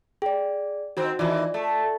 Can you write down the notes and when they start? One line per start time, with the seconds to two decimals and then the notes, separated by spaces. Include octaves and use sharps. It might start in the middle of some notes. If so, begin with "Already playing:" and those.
0.22 G#4 D5 G5
0.97 D#3 C4 F#4
1.19 D#3 E3 F4 D5
1.54 A3